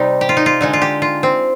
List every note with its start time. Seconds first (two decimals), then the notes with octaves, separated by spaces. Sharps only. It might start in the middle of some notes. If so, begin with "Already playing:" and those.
Already playing: C3 G3 D#4
0.21 G4
0.29 F4
0.37 D#4
0.46 F4
0.61 D3 G#3 D#4
0.73 F4
0.82 G4
1.02 F4
1.23 C4